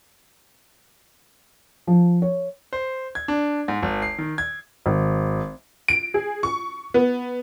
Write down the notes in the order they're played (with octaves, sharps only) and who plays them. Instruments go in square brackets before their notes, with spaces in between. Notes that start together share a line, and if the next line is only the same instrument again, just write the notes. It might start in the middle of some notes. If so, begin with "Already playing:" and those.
[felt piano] F3
C#5
[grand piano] C5
G#6
D4
G#2
G#1
C7
D#3
G#6
[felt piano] G#1
[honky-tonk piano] D7
G#4
C#6
B3